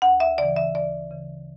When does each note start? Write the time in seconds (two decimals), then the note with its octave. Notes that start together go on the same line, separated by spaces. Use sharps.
0.02 D2 F#5
0.20 E5
0.38 C#3 E3 D5
0.56 E5
0.74 D2 D5
1.11 C#3 E3